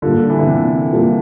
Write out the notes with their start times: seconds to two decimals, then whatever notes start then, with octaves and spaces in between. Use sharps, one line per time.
0.02 A#2 D3 G3 A#3 F4 A4
0.30 E3
0.39 D3
0.47 C3
0.93 A#2 G3 A#3 F4 A4